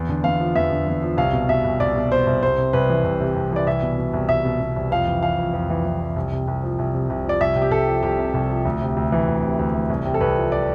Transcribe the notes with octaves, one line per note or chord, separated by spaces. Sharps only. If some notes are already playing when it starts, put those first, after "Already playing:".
Already playing: E2
D3
E2 F5
F3
E2 E5
D3
E2
F3
C2 F5
B2
B2 E5
C2
C2 D5
B2
B2 C5
C2
C2 C5
C3
C2 B4
E3
C2
C3
C2
E3 D5
C2 E5
B2
B2
C2
C2 E5
B2
B2
C2
F2 F5
E3
E3 F5
F2
F2
E3
E3
F2
C2
C3
C2
F3
C2
C3
C2
F3 D5
C2 E5
C3
G4
C2 A4
F3
C2 G4
C3
C2
F3
D2
C3
D2
E3
D2
C3
D2
E3
C2
C3
A4
C2 B4
F3
D5